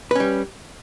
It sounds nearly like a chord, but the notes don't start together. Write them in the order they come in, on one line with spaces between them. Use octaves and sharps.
B4 C#4 G3